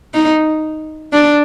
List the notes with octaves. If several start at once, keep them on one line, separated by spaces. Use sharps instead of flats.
D#4
D4